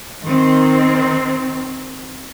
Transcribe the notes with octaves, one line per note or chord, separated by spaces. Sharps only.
D#3 C4